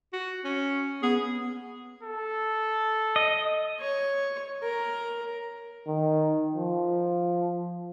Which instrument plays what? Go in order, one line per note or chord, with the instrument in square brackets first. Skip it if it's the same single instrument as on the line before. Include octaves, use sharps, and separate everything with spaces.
[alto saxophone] F#4
C#4
[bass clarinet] B3 [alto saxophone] G#4
[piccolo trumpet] A4
[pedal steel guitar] D#5
[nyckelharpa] C#5
A#4
[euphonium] D#3
F3